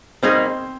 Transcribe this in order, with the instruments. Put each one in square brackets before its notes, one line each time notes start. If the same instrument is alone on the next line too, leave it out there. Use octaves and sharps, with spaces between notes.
[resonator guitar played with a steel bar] B2 G3 A#3 D#4 G#4 [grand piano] C4 C5